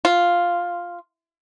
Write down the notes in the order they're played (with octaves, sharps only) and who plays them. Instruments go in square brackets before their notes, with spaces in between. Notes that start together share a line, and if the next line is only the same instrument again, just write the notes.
[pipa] F4